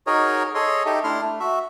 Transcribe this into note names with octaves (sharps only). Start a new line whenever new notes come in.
D#4 F#4 G#4 A#4 C#5 D#5
G#4 A4 C#5 D#5 C6
D#4 G4 A4 D#5 E5
A3 D4 E4 C6 F6
A3
F#4 E5